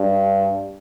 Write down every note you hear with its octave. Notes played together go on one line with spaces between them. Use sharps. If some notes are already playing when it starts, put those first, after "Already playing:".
Already playing: G2